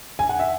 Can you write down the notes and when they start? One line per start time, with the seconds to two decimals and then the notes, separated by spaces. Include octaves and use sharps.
0.19 G#5
0.29 F#5
0.39 E5